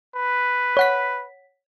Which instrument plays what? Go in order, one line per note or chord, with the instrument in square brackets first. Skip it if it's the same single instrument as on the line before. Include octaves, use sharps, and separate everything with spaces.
[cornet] B4
[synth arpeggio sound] C#5 F#5 B6